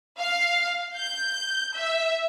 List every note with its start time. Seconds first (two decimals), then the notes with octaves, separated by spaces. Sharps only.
0.19 F5
0.95 G6
1.74 E5